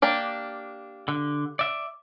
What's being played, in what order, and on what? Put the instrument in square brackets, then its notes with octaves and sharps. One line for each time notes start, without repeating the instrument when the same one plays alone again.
[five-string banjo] A#3 D4 G4
[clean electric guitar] D3
D5 E5